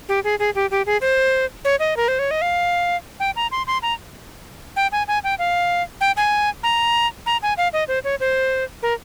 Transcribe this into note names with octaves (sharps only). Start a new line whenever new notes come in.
G4
G#4
G#4
G4
G4
G#4
C5
C#5
D#5
A#4
C5
C#5
D#5
F5
G5
A#5
C6
C6
A#5
G5
G#5
G#5
G5
F5
G5
G#5
A#5
A#5
G#5
F5
D#5
C5
C#5
C5
A#4